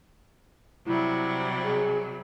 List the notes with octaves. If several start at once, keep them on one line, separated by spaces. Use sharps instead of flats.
C3 F#3 G3 E4
G#4